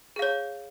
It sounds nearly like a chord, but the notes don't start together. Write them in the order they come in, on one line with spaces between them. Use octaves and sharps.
G#4 F5 C#5